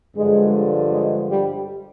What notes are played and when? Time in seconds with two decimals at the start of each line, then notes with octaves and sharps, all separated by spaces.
0.17 G2 D3 F3 G#3
0.91 G#3
1.28 G3